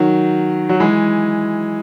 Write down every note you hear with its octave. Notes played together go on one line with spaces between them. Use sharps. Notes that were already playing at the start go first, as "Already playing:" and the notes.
Already playing: D#3 F#3
F#3
E3 G#3